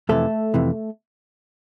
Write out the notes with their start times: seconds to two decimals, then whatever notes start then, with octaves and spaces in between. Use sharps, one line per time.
0.09 F2 C3 E3 A3 A4
0.54 F2 C3 E3